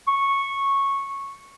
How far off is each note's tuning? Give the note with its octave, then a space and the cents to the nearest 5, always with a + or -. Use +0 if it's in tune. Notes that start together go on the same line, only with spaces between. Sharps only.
C#6 -10